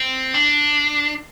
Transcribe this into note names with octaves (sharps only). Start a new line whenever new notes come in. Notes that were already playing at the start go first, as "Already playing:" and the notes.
Already playing: C4
D4